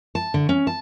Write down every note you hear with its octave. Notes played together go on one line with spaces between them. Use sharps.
A5
D3
C#4
A5